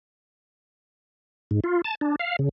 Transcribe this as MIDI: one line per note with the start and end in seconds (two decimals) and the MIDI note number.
1.51 1.60 44
1.64 1.81 65
1.84 1.95 81
2.01 2.16 62
2.19 2.36 77
2.39 2.49 49